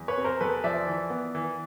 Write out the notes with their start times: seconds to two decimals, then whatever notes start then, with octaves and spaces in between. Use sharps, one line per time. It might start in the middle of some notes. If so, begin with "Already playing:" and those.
Already playing: E2
0.08 B4 C#5
0.17 C3
0.24 A#4 C5
0.40 E2 A4 B4
0.64 F3 D5 E5
0.87 E3
1.10 B3
1.35 E3